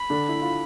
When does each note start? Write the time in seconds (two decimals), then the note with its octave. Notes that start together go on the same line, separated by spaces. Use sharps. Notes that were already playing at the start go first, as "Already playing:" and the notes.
Already playing: B5
0.10 D3 D4
0.29 E4
0.42 F4